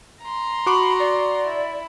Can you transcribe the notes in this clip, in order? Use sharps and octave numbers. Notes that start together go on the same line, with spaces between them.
A#5 C6
F#4 B5 C#6 D6
D5
E4